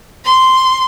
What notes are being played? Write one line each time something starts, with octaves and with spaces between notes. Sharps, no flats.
C6